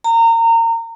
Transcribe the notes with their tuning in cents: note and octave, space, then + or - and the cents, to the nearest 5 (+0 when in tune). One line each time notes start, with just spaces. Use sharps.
A#5 -25